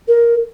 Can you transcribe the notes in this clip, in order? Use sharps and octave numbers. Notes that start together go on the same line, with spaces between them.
A#4